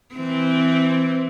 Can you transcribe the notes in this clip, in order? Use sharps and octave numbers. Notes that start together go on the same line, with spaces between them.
E3 C4